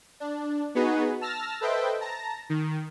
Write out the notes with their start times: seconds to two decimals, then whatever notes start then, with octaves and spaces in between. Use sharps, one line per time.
0.20 D4
0.75 B3 D#4 F#4 G#4 B4
1.21 A5 E6 F6 A6 A#6
1.61 A4 B4 C5 D#5 E5 G5
2.01 A5 A#5 A#6
2.49 D#3